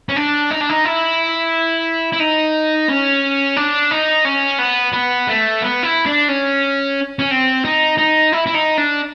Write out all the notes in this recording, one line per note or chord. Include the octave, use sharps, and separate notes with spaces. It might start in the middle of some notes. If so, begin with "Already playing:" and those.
C#4
D4
D#4
D4
D#4
E4
E4
D#4
C#4
D4
D#4
C#4
B3
B3
A3
B3
E4
D4
C#4
C#4
C4
D#4
D#4
E4
E4
D#4
D4